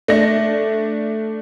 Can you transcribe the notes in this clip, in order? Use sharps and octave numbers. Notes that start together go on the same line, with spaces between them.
A3 D4 A#6